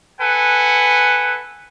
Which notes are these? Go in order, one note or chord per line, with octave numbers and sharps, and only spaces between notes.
A4 B4 F#5 G#5